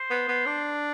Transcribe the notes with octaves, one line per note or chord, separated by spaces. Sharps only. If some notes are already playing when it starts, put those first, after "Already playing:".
Already playing: C5
B3
B3
D4